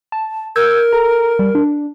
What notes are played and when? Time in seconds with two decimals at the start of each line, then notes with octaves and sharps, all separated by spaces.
0.12 A5
0.56 A#4 E6 G6 G#6
0.92 A4 A#5
1.39 G3
1.55 D4